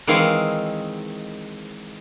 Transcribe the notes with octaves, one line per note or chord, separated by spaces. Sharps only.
D#3 E3 G#3 C4 F5